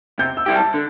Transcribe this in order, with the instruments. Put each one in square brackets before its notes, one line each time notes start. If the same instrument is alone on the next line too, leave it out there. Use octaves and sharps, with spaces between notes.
[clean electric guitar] C3 [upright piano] G6
[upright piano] E6
[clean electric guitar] G3 E4 G4
[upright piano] A5
[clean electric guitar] D3